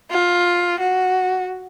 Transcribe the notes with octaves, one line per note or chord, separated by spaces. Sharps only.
F4
F#4